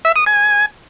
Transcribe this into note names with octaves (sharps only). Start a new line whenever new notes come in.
E5
D#6
G#5